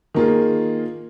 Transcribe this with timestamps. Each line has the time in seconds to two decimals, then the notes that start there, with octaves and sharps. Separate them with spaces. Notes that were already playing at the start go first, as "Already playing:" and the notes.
0.14 D#3 A#3 F4 G#4